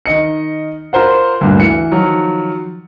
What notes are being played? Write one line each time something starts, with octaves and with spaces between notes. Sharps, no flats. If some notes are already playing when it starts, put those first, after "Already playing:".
D#3 D#5 C#7
F4 A#4 C5 F#5
D2 G2 A#2
E3 C#7
D#3 F3 F#3